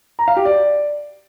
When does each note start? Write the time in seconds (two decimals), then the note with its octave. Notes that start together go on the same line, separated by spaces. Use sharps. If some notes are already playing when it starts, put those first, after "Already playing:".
0.19 A#5
0.28 F5
0.36 G4
0.45 D5